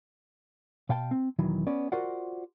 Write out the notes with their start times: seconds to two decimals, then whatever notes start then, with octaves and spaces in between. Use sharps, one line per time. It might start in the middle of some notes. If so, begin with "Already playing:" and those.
0.89 B2 F5 G5 A5
1.11 C4
1.39 B1 E2 D#3 E3 F#3
1.67 B3 C#4 D5
1.92 F4 F#4 A#4 C5 D5 F#5